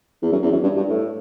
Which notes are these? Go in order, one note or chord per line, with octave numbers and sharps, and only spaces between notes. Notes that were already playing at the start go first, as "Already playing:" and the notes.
E2
F#2
E2
F#2
G2
G2
A2